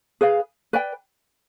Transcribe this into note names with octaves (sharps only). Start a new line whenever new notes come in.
G#4 B4 F5
B4 D5 G5